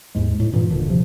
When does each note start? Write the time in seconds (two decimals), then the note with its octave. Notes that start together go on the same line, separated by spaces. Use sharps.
0.15 D#2 G#2 G#3
0.40 A2
0.53 G2 A#2 E3
0.70 D#1 D2 D#3 D4
0.88 C3 F3